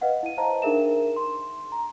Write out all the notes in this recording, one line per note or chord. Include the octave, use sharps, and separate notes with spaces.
B4 D#5 F5 F#5
E4 D#7
C5 D#5 F5 A5 A#5
D4 D#4 G#4 A#4 E5 E7
C6
A#5